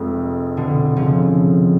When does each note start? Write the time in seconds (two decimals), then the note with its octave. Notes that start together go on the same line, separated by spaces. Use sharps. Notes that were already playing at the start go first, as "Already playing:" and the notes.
Already playing: F1 F2 G#3
0.57 B2 D3
0.96 C#3 F3